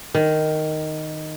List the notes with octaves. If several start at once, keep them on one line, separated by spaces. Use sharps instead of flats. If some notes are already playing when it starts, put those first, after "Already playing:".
D#3